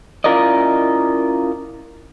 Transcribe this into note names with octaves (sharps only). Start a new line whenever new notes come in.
C#4 E4 F4 A#4 D5 D#5